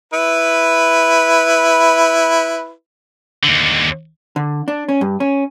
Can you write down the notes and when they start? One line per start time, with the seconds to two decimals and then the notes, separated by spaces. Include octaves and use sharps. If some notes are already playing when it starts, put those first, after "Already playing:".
0.13 E4 B4
3.44 D#2 D3
4.36 D3
4.68 D4
4.89 C#4
5.01 G2
5.20 C#4